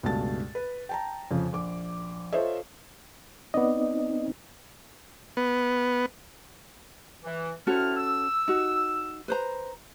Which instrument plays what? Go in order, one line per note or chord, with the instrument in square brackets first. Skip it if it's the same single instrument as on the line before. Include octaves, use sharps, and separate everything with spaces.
[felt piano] C#2 G2 B2 A3 A5 A6
B4
G5 A5 A#5
F2 C#3 F3
A#1 D6
F4 A4 C5 C#5 D#5 E5
[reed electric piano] B3 D5 D#5 [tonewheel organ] C4 D#4
[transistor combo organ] B3
[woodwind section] E3
[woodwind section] C3 E4 F6 [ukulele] C#4 F#4 A4
[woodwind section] E6
[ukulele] D#4 F#4
B4 C5 A#5